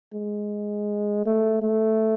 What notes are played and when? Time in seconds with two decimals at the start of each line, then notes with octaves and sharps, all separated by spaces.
0.14 G#3
1.26 A3
1.62 A3